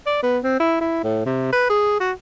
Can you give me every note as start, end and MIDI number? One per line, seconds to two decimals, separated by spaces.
0.06 0.18 74
0.23 0.38 59
0.44 0.60 60
0.60 0.76 64
0.81 1.03 64
1.04 1.22 45
1.26 1.50 48
1.53 1.66 71
1.70 1.98 68
2.00 2.12 66